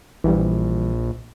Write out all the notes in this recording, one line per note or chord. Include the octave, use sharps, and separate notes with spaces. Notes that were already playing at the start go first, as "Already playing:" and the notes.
A#1 E3 G3